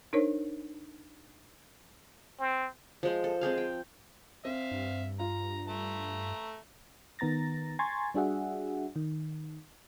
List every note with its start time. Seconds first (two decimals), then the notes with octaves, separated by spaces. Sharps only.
0.13 D4 D#4 A#4 C5 C#5
2.40 C4
3.03 F3 G#3 C5
3.24 A4
3.41 G#3 C4 G#4 F5
3.58 G5
4.45 C4 E5 F5
4.71 G2
5.20 F4 A#5
5.68 A3 A#5
7.19 D#3 B3 A#5 A6 A#6
7.79 G#5 A#5 C6 C#6 G#6 A6
8.14 G3 D4 F#4 G#4 E5 F#5
8.96 D#3